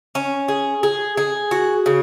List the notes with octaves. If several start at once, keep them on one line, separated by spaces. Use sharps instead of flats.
C#4
G#4
G#4
G#4
F#4
C#3